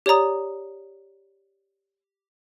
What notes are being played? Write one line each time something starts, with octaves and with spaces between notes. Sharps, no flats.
G4 C#5 D5 A#5 D#6